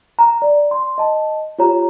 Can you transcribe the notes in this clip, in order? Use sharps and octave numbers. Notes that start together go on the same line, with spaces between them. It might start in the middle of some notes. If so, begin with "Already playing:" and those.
A#5
D5
C6
D#5 A5
F4 G4 C#5 A#5